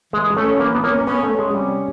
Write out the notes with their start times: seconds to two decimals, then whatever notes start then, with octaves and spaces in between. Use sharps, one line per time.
0.13 E3 G#3
0.37 A3 C#4
0.60 E3 A#3
0.75 B3
0.84 A#3 C#4
1.07 B3 C#4
1.23 A3
1.31 C#4
1.39 G#3
1.55 C3 G3